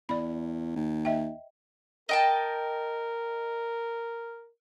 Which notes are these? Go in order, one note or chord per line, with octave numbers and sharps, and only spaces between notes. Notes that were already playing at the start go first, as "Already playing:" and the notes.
E2 D5 B5
D#2
D#5 E5 G5
A#4 D#5 G5 A5